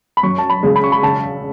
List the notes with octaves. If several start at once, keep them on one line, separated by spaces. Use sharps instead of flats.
B5
F#2 C#6
A5
B5
C#3 G#3
B5
C#6
B5
C#3 A5